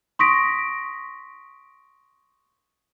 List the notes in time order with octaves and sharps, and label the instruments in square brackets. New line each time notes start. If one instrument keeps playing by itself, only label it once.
[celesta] C6 C#6 D#6 A#6 B6 D7